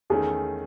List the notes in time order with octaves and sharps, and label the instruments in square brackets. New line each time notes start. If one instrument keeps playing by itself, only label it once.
[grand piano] E2 D#3 A3 C#4 [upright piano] G#4